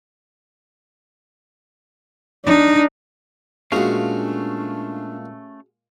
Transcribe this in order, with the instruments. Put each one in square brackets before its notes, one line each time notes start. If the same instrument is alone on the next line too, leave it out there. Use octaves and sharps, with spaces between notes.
[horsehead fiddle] D4 [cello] D#4
[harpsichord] A#2 G#3 [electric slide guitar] A3 C#4 F5 [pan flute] D4 [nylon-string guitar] F#4 G#4